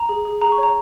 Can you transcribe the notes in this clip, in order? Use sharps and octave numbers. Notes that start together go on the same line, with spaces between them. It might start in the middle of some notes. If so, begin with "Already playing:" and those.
Already playing: A#5
G#4
G#4
G#4 A#5
C#6
C#5 A#5